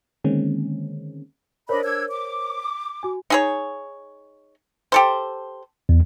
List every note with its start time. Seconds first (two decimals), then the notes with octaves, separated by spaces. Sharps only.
0.24 D3 D#3 G#3 A#3 C4 C#4
1.69 D4 A#4 C5 C#5 D#5 B5
1.84 D4 E6 G#6
2.09 D6
3.03 F#4 G#5
3.30 D#4 G#4 C#5
4.92 G4 A4 C5
5.89 E2